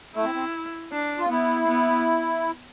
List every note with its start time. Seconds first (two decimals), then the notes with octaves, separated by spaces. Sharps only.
0.15 A3 E4
0.24 C4
0.35 C4
0.92 D4
1.19 F4
1.29 B3 E4
1.68 B3